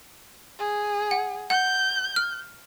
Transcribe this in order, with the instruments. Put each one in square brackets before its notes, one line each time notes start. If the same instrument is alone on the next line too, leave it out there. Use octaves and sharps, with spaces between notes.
[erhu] G#4
[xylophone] F#5
[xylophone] F#5 [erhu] G6
[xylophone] F6